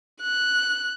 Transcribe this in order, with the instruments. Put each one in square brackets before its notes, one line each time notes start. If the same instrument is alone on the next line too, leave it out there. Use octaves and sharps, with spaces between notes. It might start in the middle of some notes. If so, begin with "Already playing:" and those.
[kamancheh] F#6